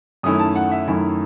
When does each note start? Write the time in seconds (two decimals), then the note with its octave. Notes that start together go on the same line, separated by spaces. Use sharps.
0.23 F#2 D#3 A3 C#4 E4 D#6
0.39 A5
0.55 F#5
0.71 E5
0.88 F#2 D#3 A3 C#4 E4